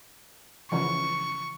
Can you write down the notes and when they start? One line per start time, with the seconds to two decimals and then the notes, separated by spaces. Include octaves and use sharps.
0.72 C#3 E3 F3 C#6